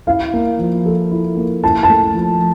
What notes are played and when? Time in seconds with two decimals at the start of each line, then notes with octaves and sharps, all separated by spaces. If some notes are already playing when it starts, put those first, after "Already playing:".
0.07 E4 F5
0.34 A#3
0.59 F3
0.86 A4
1.12 E4
1.37 A#3
1.64 E4 A5
1.83 A5
1.90 A3
2.15 F3